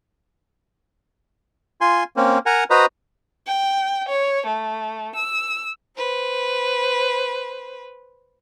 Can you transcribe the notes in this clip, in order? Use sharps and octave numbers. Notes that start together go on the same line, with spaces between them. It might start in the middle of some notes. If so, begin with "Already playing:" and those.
F4 G#5 C6
A#3 C4 C#4
A#4 F#5 G#5 A#5
F#4 B4 C5 D#5 A#5
G5
C#5
A3
E6
B4 C5